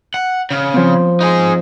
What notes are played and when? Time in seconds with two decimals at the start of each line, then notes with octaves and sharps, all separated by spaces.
0.14 F#5
0.51 C#3
0.73 F3 C4
1.21 D#4 G#4